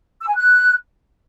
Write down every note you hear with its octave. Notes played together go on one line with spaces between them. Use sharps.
E6
G#5
F#6